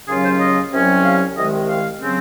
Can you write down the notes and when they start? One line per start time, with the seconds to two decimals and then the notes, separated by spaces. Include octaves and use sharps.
0.08 D#2 C#3 F#3 C#4 F4 G#4
0.23 C5
0.40 D#5
0.72 C2 C3 F#3 C#4
1.04 F5
1.36 C2 C3 D#3 G#3 D#5
1.68 F5
2.00 C#3 F#3 C4